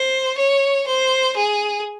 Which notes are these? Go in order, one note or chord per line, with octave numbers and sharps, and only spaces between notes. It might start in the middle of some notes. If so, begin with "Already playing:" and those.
Already playing: C5
C#5
C5
G#4